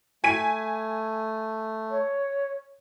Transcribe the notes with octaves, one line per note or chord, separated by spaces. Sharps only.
A3 G#5 B6 D#7
C#5